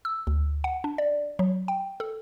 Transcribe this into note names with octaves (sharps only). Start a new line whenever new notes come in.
E6
D2
F#5
D4
D5
F#3
G5
A4